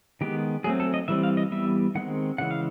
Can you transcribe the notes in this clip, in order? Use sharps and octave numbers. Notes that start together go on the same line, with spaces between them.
D#3 G#3 B3 G4
F#3 A3 C4 G#4
A4
D#5
E3 G3 C4 E5
F5
D#5
E3 G3 B3 E5
D#3 G#3 C4 F#5
C#3 E3 G#3 F#5
F5